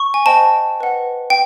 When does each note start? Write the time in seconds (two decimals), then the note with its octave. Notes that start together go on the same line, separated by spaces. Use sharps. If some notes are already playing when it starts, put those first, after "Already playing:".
Already playing: C#6
0.14 G#5
0.26 C5 D#5 G5 A5
0.80 B4 D#5 F#5
1.30 G5